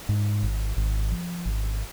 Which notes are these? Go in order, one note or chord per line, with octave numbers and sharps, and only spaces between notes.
G#2
G#1
G#1
F3
G#1